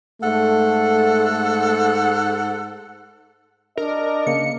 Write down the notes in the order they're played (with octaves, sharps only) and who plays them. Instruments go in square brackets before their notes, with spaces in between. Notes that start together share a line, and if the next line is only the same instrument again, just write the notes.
[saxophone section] G#2 A4 F#5 [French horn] A3
[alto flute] D4 [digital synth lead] A#4 [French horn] D#5
[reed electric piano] C#3 A#3 D6 [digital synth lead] C#7